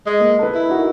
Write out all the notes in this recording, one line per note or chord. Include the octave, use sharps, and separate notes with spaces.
G#3
A#3
A4 B4
E4
D#4 F#4 A#4